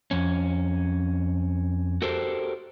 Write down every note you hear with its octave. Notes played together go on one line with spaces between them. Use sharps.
F2 C#4
F#4 G4 A4 A#4 C5